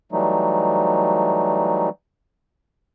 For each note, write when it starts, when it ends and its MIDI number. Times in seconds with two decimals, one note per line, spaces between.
0.12 1.89 52
0.12 1.89 54
0.12 1.89 55
0.12 1.89 57
0.12 1.89 63